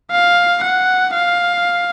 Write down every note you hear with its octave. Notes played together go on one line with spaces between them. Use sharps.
F5
F#5
F5